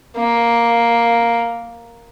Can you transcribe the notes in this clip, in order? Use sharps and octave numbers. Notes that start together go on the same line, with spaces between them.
A#3